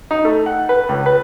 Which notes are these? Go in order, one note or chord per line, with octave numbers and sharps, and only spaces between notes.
D#4
A3
F#5
B4
C#2
B4